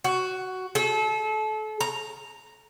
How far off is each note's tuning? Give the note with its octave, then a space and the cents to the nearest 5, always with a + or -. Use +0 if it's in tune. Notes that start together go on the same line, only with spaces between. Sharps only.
F#4 +10
A4 -30
A#5 -5